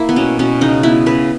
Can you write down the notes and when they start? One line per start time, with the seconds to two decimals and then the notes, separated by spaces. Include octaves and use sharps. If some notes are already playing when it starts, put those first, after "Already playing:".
Already playing: A#3 E4
0.09 B3
0.16 B2 C#4
0.39 B2 C#4
0.61 C#3 D#4
0.83 B3 E4
1.06 C#3 B4